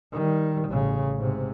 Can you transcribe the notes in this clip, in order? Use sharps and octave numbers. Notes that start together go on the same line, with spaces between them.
D#3 G3
A1 C#3
G#2 C3